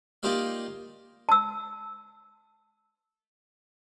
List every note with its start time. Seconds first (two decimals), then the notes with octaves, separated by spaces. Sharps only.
0.23 A#3 D#4 F4 G4 D5 F5
1.29 A5 E6